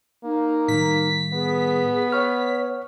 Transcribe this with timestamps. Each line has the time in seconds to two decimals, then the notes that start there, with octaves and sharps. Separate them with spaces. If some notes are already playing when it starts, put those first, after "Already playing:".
0.24 A#3 D#4
0.68 A2 D#3 G3 B6
1.34 B3 G#4
2.12 C#5 F#5 C#6 F6